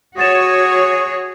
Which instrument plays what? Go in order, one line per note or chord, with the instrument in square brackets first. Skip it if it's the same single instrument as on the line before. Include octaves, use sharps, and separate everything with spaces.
[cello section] F#4 C#5 [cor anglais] G#4 [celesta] F#5 A6 E7